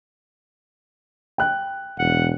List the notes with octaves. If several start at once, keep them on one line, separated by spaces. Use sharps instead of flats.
G5 F#6
E1 F#5